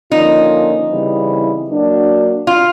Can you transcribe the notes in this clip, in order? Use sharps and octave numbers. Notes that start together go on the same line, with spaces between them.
D3 F3 A#3 C#4 D#4 F4
C#3 E3 G3 C4 E4
F#3 A#3 D4 F#4
F4